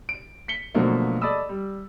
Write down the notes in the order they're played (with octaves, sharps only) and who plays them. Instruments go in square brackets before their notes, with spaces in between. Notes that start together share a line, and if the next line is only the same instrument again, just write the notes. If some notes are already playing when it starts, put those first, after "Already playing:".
[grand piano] D7
B6 C#7 G7
B2 D3 F3 F#3 A3 A#3
A4 D5 D#5 B5 D#6 E6
G3